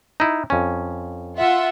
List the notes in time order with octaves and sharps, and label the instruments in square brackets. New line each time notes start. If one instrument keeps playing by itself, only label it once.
[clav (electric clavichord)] D#4 E4
F2 C#4
[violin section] F4 E5 F#5